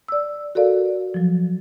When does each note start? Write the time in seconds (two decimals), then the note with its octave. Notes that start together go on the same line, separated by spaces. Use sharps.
0.08 D5 E6
0.55 F#4 A4 A#4 D5 F5
1.14 F3 F#3